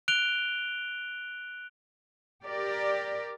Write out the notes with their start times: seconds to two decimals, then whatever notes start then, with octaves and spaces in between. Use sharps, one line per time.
0.08 F#6 D7 F7 G7
2.45 G4 A#4 D5